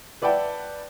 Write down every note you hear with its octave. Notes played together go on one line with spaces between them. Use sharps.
B4 D5 E5 F#5 G5 A5